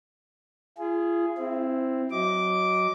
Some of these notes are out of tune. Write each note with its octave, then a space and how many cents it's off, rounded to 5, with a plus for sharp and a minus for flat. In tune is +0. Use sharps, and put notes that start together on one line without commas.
F4 -40 G#4 +0
C4 +0 E4 +0
F#3 +0 D#5 +20 D6 -10